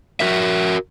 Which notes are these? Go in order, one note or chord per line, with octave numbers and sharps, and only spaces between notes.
F#4 A#4 E5